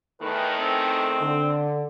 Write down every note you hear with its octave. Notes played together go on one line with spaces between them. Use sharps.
E2 D#3 A3 B4
C4
D3